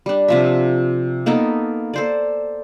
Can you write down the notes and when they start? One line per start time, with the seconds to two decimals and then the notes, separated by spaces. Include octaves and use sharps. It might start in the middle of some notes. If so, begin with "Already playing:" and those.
0.06 G3 D4
0.28 C3 F3 E5
1.26 A#3 B3 D#4 A4
1.94 A4 C5 D5